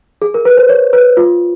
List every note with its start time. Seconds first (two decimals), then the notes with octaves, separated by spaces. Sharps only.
0.22 G#4
0.34 A#4
0.45 B4
0.57 C5
0.69 C#5
0.93 B4
1.17 F4